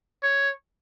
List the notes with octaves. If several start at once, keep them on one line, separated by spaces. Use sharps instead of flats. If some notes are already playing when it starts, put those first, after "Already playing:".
C#5